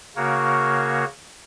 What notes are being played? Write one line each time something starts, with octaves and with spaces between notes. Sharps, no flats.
C#3 A#3 F#4 A#4 C#5